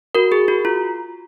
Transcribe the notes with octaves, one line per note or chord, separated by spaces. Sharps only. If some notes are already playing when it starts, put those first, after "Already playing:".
F#4 A#4
G#4
F#4
F4